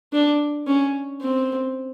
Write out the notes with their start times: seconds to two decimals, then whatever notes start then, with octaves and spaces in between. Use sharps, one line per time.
0.13 D4
0.67 C#4
1.22 C4